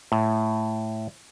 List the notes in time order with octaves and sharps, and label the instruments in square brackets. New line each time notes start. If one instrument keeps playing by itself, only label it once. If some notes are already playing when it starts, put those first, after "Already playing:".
[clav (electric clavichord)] A2